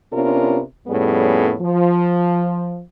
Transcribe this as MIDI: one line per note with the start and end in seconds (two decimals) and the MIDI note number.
0.12 0.61 48
0.12 0.61 59
0.12 0.61 61
0.12 0.61 62
0.12 0.61 65
0.12 0.61 70
0.87 1.54 41
0.87 1.54 45
0.87 1.54 55
0.87 1.54 59
0.87 1.54 61
0.87 1.54 68
1.61 2.81 53